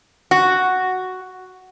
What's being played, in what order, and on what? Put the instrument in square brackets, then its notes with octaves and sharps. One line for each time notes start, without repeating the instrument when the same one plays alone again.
[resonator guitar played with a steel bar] F#4